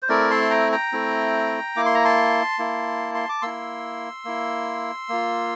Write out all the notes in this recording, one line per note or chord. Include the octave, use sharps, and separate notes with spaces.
C5
A3 C4 E4 A#4 D5
A5 C6
G5 A#5
G5 A#5
A3 C4 E4
A#3 E4 D6
C6
A#5
A5 C6
A#3 E4
C6
D6
A#3 E4 C6 E6
A#3 E4
A#3 F4